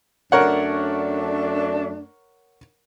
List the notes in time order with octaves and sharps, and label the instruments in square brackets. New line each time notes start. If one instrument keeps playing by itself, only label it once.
[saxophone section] F#2 A3 D4 [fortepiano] A#4 C#5 F#5